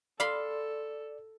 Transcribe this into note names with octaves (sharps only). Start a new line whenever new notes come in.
A4 D5 F5 B5 C6